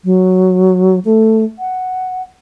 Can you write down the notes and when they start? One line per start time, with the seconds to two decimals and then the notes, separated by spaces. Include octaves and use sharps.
0.05 F#3
1.05 A3
1.59 F#5